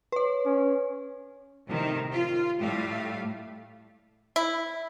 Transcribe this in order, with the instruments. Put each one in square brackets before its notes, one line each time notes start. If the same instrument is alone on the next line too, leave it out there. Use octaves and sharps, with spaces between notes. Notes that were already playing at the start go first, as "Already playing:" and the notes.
[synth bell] B4 C#5
[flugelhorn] C#4
[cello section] A2 C3 D#3
F4
A2 G3 A3 F5
[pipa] E4